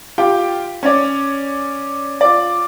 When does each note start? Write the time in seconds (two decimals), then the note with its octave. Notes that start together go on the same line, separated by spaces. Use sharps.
0.18 F4 G4 G5
0.83 C#4 C#5 D5
2.21 F4 D5